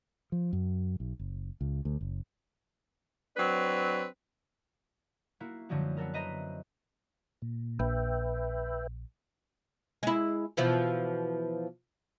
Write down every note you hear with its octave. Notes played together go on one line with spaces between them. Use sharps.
F3
F#2
B1
F#1
C#2
D2
F#1
F#3 C4 D4 B4
A#3 E4 F#4
F#2 D3 F3 G3 G#3 F#4
B3 F#4 A4 A#4
B4 C5 D#5 E5 A#5
A#2
A#1 B4 E5 G5
G#3 E4
B2 E3 F3